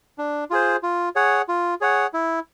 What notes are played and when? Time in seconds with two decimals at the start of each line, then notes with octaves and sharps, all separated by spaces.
0.18 D4
0.50 F4 G#4 C5
0.83 F4
1.16 G#4 C#5 F#5
1.48 F4
1.81 G#4 C#5 F#5
2.14 E4